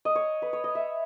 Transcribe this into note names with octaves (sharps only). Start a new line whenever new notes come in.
D#5
C#5
B4
C#5
D#5
E5